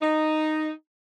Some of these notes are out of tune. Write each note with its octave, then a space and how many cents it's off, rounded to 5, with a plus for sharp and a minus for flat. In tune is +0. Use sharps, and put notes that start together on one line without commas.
D#4 -5